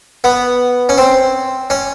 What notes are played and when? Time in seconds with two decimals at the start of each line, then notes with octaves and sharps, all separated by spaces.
0.24 B3
0.89 C#4
0.98 C4
1.70 C#4